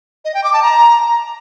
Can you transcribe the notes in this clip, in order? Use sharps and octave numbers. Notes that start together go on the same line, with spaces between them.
D#5
G5
D6
A5
A#5